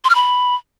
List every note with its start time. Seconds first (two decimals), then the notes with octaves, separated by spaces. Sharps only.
0.04 C6
0.10 F6
0.15 B5